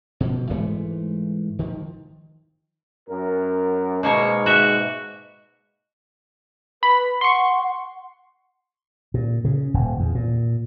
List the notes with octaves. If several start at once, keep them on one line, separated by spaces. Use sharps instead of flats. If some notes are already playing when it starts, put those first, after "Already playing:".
B2 F3
G#2 E3 G#3 A3
D#3 F3
F#2 A#4
G#2 B2 A#3 C#5
F#4 E5
B4 B5
F#5 C6 C#6
A#2
C#3
D#1
E2
A#2